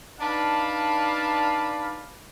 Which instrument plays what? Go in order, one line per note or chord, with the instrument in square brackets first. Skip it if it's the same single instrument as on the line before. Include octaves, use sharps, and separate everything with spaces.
[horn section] D4 D#4 B4 D5 F5 A5